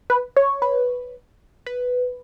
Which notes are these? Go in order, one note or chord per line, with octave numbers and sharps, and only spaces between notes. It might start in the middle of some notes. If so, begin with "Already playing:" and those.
B4
C#5
B4
B4